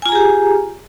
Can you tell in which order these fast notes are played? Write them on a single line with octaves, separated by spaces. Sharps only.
G#5 F4 A#5 G#4 G4